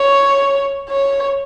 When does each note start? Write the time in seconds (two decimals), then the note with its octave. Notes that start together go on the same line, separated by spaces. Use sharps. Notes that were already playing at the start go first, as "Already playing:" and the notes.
Already playing: C#5
0.89 C#5